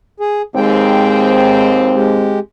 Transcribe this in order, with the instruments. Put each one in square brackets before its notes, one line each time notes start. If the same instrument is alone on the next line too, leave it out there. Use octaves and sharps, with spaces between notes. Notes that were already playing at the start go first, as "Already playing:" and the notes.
[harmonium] G#4
[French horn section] D#2 G#2 C4 [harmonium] G#3 G5
[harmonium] G#3 G4